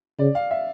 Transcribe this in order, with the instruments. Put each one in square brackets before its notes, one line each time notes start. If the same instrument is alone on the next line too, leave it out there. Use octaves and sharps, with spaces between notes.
[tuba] C#3 [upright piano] D5
[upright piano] F5
E5